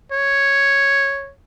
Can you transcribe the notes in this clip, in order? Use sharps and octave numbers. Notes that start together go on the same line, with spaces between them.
C#5